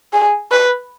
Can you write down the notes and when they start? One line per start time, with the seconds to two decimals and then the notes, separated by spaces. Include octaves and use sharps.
0.13 G#4
0.52 B4